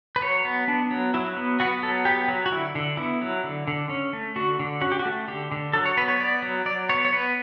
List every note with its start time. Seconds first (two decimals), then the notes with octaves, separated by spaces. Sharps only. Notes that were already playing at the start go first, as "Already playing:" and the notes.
0.16 B4
0.22 F#3 C#5
0.45 B3
0.68 B3 D4
0.91 F#3
1.14 F#3 E4
1.37 B3
1.60 B3 F#4
1.82 F#3 A4
2.05 B3 G4
2.28 F#3
2.46 F#4
2.52 D3 E4
2.75 D3
2.97 B3 E4
3.21 F#3
3.44 D3
3.68 D3
3.90 C#4
4.13 A3
4.36 D3 F#4
4.59 D3
4.81 C#4 F#4
4.92 G4
4.99 F#4
5.05 A3
5.28 D3 G4
5.52 D3
5.73 F#3 A4
5.86 C#5
5.97 B3 B4
6.08 C#5
6.20 B3 D5
6.42 F#3
6.65 F#3 D5
6.89 B3 C#5
7.05 C#5
7.13 B3 B4